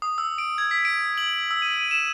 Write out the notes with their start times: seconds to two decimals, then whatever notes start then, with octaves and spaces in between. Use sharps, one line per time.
0.02 D#6
0.18 E6
0.38 D7
0.58 G#6
0.71 B6
0.85 D7
1.18 F#7
1.51 E6
1.62 D#7
1.77 D#7
1.91 E7